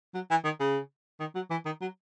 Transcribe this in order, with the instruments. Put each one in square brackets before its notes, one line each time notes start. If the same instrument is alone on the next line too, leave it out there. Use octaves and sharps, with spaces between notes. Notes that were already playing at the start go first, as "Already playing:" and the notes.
[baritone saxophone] F#3
E3
D#3
C#3
D#3
F#3
E3
D#3
F#3